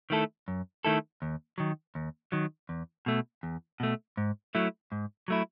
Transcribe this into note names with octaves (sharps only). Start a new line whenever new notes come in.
D#3 A3 E4 A4
F#2
D#3 A3 E4 A4
D#2
D#3 F#3
D#2
D#3 F#3
E2
B2 A3
E2
B2 A3
G#2
F#3 A3 E4
G#2
F#3 A3 E4